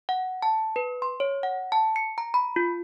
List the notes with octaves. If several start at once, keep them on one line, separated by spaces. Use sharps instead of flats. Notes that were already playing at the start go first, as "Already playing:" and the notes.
F#5
A5
B4
C6
C#5
F#5
A5
C#7
A#5
B5
F4